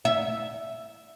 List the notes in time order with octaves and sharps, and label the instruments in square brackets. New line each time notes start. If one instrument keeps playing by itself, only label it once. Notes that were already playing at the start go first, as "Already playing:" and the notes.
[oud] E5